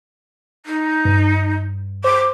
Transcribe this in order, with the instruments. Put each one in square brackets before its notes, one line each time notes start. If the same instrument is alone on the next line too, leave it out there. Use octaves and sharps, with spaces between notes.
[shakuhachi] D#4
[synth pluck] G2
[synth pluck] C5 [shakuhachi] D6